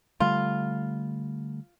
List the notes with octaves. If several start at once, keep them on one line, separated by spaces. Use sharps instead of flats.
D3 G3 A3 F4